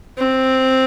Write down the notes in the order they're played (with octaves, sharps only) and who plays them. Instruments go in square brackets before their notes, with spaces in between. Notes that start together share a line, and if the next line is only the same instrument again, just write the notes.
[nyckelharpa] C4